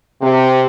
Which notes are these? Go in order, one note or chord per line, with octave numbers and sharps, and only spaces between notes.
C3